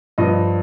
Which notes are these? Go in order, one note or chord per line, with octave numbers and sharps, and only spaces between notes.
G2 F3 D#5